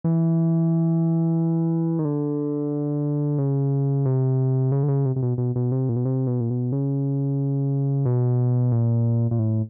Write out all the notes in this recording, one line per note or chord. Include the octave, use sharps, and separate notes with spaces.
E3
D#3
D3
C#3
C3
C#3
D3
C#3
C3
C3
B2
B2
B2
C3
A#2
B2
C3
B2
A#2
B2
C#3
B2
A#2
A#2
A2